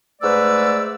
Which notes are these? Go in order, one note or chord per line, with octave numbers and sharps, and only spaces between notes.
G#2 A3 B4 D5 E6